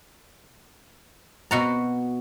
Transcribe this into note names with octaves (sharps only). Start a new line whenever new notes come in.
B2 F#4 A#5